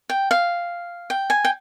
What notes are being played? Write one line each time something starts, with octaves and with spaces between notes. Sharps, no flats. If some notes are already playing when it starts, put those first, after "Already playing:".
G5
F5
G5
G#5
G5